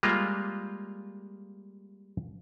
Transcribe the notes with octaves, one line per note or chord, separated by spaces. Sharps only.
G3 G#3 A#3 F4